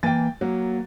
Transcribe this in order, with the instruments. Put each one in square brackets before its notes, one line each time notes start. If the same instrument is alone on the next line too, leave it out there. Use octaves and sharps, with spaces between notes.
[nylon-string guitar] E3 A#3 G#5 [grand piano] G5 A6
[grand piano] F#3 [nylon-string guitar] A#3